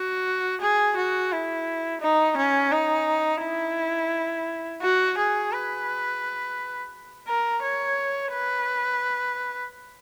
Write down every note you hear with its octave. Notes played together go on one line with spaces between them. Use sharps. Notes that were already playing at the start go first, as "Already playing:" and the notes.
Already playing: F#4
G#4
F#4
E4
D#4
C#4
D#4
E4
F#4
G#4
B4
A#4
C#5
B4